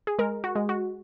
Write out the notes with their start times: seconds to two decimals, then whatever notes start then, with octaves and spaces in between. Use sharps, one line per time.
0.07 G#4
0.19 G#3 A#4
0.44 F#4
0.55 G#3
0.69 F#4